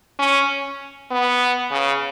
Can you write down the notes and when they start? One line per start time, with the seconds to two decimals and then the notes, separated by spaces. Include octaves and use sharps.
0.19 C#4
1.11 B3
1.71 C#3